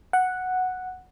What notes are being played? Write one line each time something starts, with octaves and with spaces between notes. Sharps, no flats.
F#5